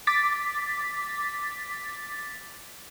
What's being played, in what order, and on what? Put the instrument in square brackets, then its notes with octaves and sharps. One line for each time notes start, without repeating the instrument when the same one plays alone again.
[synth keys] D6 A6 B6